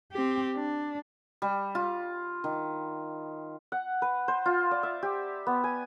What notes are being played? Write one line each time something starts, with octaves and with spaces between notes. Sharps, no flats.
C4 G4
D4
G3
F4
D#3
F#5
B4
C5
F4
D5
E5
G4
B3
G#5